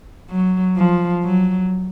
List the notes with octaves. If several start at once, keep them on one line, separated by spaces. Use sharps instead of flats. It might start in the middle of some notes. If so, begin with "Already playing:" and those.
F#3
F3
F#3